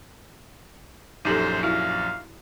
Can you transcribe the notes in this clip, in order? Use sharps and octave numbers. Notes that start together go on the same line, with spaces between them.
A#1 F#2 D#4 G4 A4 C5
E4 F#4 E5 F5